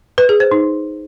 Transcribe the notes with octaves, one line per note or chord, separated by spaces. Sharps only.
B4
G#4
C5
D#4